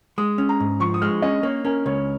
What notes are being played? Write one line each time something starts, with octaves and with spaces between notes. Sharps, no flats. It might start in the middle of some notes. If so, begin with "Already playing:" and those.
G#3 D#6
C#4
A#5
G#2
F3 C#6
D#6
G#3 F6
C#4 D#5
A#3 C#5
C#4 A#4
C#2 C#5